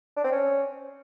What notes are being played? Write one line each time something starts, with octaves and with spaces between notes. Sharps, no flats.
D4
C4
C#4